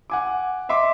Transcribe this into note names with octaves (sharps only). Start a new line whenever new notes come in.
F#5 G#5 D6
D#5 E5 C6 D6